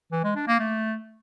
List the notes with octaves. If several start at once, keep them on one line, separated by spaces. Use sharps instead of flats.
E3
G#3
D4
A#3
A3